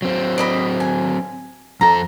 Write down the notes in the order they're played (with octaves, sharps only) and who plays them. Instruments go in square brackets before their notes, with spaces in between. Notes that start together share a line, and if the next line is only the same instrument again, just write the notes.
[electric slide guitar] F#3 C4
[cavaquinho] D5 D#5 B5
G#5
[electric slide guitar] F2 F4 A4 [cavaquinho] A#5